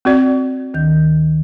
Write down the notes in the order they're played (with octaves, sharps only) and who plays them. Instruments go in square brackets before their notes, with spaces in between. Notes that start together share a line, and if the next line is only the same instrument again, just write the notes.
[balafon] C4 F#4 D5
[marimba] D2 D#3 G6